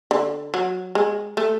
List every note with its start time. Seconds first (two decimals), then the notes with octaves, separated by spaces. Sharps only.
0.11 D3
0.54 F#3
0.95 G#3
1.37 A3